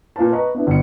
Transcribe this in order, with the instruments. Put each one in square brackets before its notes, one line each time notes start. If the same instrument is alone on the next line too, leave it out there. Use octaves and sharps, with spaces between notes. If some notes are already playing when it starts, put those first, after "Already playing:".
[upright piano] A#2 F4 B4 A5
B4 D#5 A#5 C#6
B3 D4 E4
G1 C#7